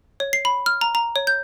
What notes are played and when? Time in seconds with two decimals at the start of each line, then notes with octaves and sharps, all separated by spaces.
0.20 C#5
0.33 C7
0.45 B5
0.66 F6
0.81 A#5
0.95 A#5
1.16 C#5
1.27 G6